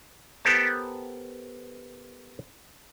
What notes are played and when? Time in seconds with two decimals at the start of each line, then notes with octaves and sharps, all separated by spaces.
0.45 B3 G4 A4 A#4 C5 A5